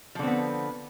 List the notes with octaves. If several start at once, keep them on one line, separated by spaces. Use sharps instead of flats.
D3 F3 B3 C4